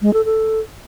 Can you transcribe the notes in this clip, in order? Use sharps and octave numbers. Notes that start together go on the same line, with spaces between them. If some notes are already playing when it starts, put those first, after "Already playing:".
G#3
A4
A4